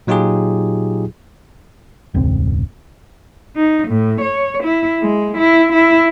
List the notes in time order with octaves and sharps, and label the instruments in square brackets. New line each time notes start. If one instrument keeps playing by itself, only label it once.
[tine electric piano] A#2 F#3 D#4 F4 G4 G#4
[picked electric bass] E1 C#2 G#2 C4
[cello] D#4
A2
C#5
E4
G#3
E4
E4